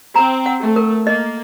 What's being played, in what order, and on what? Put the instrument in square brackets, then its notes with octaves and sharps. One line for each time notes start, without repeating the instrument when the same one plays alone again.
[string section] C4 [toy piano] A#5
[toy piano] F#5
[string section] A3
[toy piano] A#4
[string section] A#3 [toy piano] D#5